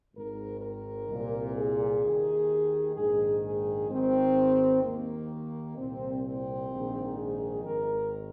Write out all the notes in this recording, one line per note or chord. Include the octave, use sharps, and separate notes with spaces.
G#1 G#2 D#3 A#4
A#4
C2 A#2
G#4
D#2 D#3
A#1 G#2 D#3 G#4
G#4
G#1 G#2 D#3 C4
D#2 D#3 A#3
C2 A#2 C4
C4
A#1 G#2 D#3
G#4
G#1 G#2 D#3 A#4